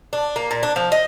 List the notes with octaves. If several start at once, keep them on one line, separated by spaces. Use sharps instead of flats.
D4
A#3
A#2
D4
F3
D#5